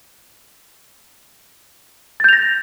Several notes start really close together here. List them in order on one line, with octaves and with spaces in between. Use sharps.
A6 G6 F7 A#6